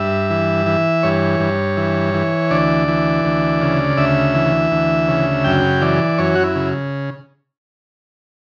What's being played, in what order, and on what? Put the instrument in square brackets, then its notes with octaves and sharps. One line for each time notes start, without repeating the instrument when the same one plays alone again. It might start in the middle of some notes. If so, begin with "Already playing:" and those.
Already playing: [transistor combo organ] G2 E5
E3
E3
G2 C#5
G2
E3
E3
D2 D5
E3
D2
C#3
D2 E5
E3
D2
C#3
F#2 G5
E3 D5
F#2 C#5
F#4
E4
C#3